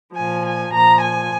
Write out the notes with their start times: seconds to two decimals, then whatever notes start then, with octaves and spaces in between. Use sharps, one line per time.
0.16 A#2 F3 G#5
0.45 G#5
0.72 A#2 F3 A#5
1.02 G#5